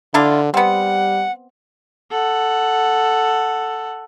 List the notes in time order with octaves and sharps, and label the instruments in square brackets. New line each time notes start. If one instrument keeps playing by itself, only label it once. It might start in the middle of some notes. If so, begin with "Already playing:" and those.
[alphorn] D3 [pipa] D4 E4 F4
[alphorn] G3 [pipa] B3 C4 [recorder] F#5
[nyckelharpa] A4 F#5